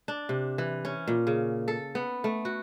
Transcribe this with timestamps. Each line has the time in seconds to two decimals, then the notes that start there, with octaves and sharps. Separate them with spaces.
0.08 D4
0.29 C3
0.58 E3
0.85 C#4
1.08 A#2
1.27 C#3
1.68 A4
1.95 B3
2.24 A3
2.45 F#4